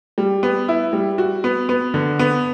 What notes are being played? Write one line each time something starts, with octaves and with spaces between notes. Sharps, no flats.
G3
B3
E4
G3
F#4
B3
B3
D3
B3